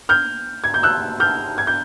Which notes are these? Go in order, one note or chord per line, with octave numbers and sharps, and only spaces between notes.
F6 G6
G#6
G6
E6 F#6
F6 G6
G#6
G6